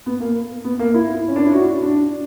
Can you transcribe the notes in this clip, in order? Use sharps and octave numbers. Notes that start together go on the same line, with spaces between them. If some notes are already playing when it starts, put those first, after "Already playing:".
B3
A#3
B3
A#3
E4
C#4
D4
E4
F#4
D4